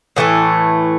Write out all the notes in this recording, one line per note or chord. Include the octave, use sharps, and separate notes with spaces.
A2 E3 A3